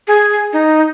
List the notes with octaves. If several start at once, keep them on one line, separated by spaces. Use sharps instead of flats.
G#4
D#4